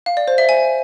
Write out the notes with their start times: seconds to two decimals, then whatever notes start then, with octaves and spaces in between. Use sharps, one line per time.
0.06 F5
0.17 D5
0.28 C5
0.38 E5
0.49 G#5